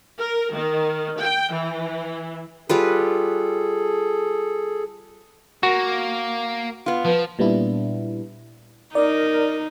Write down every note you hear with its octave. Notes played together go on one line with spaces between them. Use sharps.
A#4
D#3
G5
E3
G3 F4 G#4 A4 B4
A#3 F#4
B3 F4
F3 B4
A#2 G3 B3 D4 E4
D#4 A#4 D5